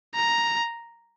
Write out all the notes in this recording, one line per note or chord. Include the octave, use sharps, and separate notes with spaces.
A#5